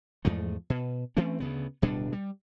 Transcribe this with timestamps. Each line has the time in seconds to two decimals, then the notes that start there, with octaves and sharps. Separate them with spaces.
0.25 E2 G#2 F3 A3
0.70 B2
1.17 E3 A3 C4 C#4
1.40 D2 C#3 B3
1.82 D1 B2 G3 D4
2.12 G3